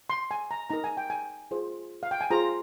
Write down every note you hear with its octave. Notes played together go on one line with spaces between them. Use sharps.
C6
G#5
A#5
D#4 A#4 A#5
G#5
G5
G#5
F4 G#4 C5
F5
G5
G#5
F4 G#4 C5 A#5